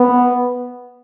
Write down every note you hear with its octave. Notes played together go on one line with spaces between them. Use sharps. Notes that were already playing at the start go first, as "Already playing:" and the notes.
Already playing: B3